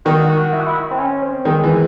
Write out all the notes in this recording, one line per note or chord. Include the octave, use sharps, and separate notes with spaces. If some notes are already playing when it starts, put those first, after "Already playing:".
D#3 F#4
F#4
E4
F#4
E4
C4
C#4
C4
D#3 G#3
E3